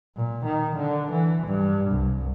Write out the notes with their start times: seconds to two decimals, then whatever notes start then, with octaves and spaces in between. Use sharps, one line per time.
0.16 A#2
0.46 D#3
0.77 D3
1.12 E3
1.48 G2
1.92 C2